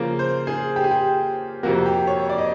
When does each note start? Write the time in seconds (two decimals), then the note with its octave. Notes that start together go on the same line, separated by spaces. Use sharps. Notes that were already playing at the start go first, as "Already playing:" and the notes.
Already playing: C#3 F3 A#3
0.19 C5
0.47 G#4
0.76 G4
0.84 G#4
0.91 G4
1.63 F2 C3 F3 A#3 F#4
1.86 G4
2.07 C#5
2.29 D5
2.38 D#5